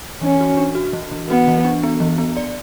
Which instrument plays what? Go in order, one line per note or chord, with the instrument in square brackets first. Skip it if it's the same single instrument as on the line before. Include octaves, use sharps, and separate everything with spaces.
[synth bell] E3 [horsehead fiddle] C#4
[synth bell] F#4
D4
F#4
E3
E3
[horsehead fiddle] B3 [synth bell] F#4
[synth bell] E3
D4
B3
E3
B3
D5